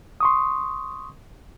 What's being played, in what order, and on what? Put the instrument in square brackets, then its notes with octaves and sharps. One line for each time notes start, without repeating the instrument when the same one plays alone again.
[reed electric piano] C6 C#6 D#6